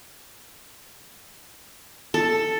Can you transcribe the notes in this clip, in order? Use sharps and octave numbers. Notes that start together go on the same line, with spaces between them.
A4